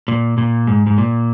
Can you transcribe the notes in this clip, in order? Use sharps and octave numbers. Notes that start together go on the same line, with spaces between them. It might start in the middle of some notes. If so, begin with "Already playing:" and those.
A#2
A#2
G#2
G#2
A#2